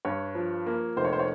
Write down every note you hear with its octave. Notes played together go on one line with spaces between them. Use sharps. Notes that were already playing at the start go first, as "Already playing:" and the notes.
G2 C#5
F3
A#3
F1 C5
C#5
C5
C#5